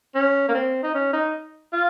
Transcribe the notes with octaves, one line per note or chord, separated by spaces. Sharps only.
C#4
A#3
C4
D#4
C#4
D#4
F4